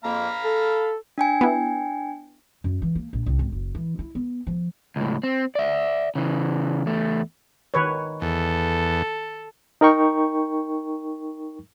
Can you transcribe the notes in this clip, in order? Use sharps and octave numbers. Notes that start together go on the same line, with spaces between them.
F2 A#3 F5 A#5 B5
A4
D4 G5 G#5
B3 E4
F#2
E3
A#3
A#1
C2
G#1
F#1
E3
E4
B3
F3
C#2 A2
C4
D5 E5
C#3 E3
E2 A3
D#3 B4 C#5
E2 A4
D#4 A#4 G5 C#6